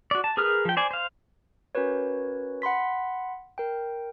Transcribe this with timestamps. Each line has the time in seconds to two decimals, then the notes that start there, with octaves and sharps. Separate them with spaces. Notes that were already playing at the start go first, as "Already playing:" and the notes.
0.11 F#4 D5
0.24 A5
0.37 G#4 A#4 B4 D#6 F6
0.65 F3 G5
0.77 C5 D5 G#5
0.91 C5 F5
1.75 C#4 F#4 A#4 B4 C#5
2.62 F#5 B5 C6 B6
3.58 A#4 G5